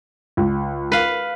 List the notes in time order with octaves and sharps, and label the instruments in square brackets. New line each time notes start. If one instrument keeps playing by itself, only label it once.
[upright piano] C#2
[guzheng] B4 F5